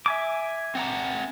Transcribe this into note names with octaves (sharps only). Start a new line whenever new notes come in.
E5 G#5 D6
C4 F#5 A#5